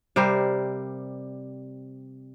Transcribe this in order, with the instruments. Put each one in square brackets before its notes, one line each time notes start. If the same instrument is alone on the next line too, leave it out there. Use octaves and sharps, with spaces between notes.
[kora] C3 G3 A#4 C5